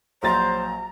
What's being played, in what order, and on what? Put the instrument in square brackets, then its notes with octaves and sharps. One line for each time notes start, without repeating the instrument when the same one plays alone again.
[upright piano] A#1 F#3 A6 [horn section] C5 [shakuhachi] A#5